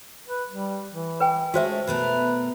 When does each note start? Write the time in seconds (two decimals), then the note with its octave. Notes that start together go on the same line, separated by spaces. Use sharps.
0.28 B4
0.50 G3
0.93 E3
1.20 B4 G5 G#5
1.54 G#3 A3 C#4 F#4 C5 E5
1.87 B2 A3 A#4 B4